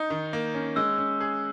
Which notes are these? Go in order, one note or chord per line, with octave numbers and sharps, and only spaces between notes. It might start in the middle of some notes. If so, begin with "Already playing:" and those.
Already playing: D#4 G6
D#3
A#3
C#4
G#3 E6
C#4
G#4